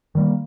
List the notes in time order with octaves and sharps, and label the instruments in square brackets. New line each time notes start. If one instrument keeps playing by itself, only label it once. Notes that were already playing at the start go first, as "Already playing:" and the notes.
[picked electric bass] D#3 G3 A#3